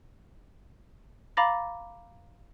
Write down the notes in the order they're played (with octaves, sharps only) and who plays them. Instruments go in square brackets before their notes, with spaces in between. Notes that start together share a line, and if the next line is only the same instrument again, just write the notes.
[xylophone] F5 A#5 B5 D6 A6 A#6